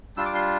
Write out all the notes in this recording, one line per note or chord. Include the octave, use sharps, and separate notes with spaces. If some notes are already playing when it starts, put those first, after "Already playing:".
G3 D4 F4 E6
D6
C6